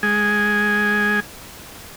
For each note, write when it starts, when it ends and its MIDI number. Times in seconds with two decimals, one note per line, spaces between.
0.03 1.20 56
0.03 1.20 68